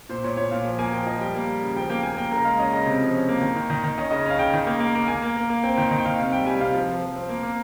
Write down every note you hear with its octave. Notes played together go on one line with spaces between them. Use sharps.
A#2 C5
A#2 C#5
A#2 C#5
A#2 F5
F3
A#3 G#5
F3 G5
F3 D#5
G3 G5
A#3
G3
C#3
F3 G5
A#3 G5
A#3 G#5
A#3 G5
C#3 A#4
G#3 F5
C#4 D#5
C#3 D#5
C3
F3
C#4
A#3
D#3
D#3
D#3
D#3
C#4 D#5
C#3 D#5
C#4 F5
C#3 G5
D#3
A#3
A#3
A#3
A#3 G#5
A#3
A#3
A#3
C4 G5
D#3 G5
D#3
G5
D#3 F5
C3 F5
G3 G5
G3 G#5
C3 F5
F3
F3
F3
C4
A#3
A#3